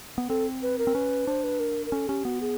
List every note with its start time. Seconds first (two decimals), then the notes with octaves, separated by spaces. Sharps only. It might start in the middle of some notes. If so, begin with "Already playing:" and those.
0.18 B3
0.29 C4 A4
0.62 B4
0.78 A#4
0.87 C4
0.95 C#4 B4
1.27 D4 C5
1.44 B4
1.60 A#4
1.86 A#4
1.92 C#4 A4
2.08 C#4 G4
2.25 B3 F#4
2.41 G#4